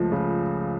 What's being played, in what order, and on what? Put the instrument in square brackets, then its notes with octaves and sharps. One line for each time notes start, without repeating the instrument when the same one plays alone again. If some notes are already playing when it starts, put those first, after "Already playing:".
Already playing: [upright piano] C#2 C#3 F3 A3
C#3